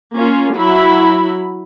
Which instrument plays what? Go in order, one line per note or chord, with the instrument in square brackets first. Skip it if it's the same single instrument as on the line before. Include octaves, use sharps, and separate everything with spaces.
[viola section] A#3 C#4 F4
F#3 E4 B5